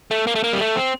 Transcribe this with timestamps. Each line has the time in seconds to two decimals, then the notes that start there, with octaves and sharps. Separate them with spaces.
0.11 A3
0.27 A#3
0.35 A3
0.44 A#3
0.53 G3
0.60 A3
0.76 C4